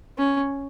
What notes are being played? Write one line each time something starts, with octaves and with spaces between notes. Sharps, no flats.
C#4